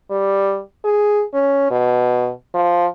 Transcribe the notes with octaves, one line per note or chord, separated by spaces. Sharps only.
G3
G#4
C#4
B2
F3